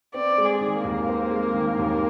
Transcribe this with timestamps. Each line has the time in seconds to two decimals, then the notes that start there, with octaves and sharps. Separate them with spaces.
0.14 C4 D5
0.38 G#3
0.45 G#4
0.61 D#3
0.77 A#3
0.84 D#2
1.08 C4
1.31 G#3
1.54 D#3
1.78 D#2